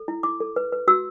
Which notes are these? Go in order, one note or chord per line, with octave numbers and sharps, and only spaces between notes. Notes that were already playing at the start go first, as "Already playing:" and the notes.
Already playing: A4
E4
E4 D6
A4
B4
B4
F#4 E6